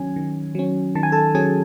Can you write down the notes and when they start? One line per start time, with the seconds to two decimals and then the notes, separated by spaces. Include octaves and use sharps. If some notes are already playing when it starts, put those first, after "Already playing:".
Already playing: D#3 F#3 C#4 G#5
0.16 D#3
0.55 F#3 C#4
0.95 D#3 A5
1.03 G#5
1.12 A4 A5
1.35 F#3 C#4 G#4 G#5